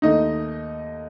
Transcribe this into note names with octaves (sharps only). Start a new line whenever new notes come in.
D#2 D#3 A3 D#4 D#5